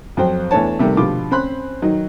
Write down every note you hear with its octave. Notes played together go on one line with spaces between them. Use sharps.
F2 F#3 C5 G5
E2 A3 B3 D4 C#5 A5
C3 D#3 G3 A3 A#3
B2 D3 F3 F4 G4 D6
C4 C#4 C5 B5 C6 F#6
D#3 F#3 D#4